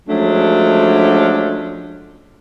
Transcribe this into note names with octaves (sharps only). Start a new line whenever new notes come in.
F3 F#3 G#3 A3 C#4 D4